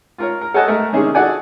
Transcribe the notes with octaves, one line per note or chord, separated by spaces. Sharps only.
F4 A#4 C#5
A#4
A4 C#5 D#5 F#5 G#5 A5
A3 A#4
C3 D#3 C#4 D4 G#4
F#4 G#4 A4 D5 F#5 G#5